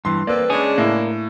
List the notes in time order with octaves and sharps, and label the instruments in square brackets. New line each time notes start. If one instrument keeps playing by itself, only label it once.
[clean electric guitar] G2 E3 [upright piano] C6
[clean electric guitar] A#3 [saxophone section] C4 A4 B4 [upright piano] D5
[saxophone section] C#3 G#3 D4 [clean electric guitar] C#4 G#4
[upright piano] A2 [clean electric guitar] A#3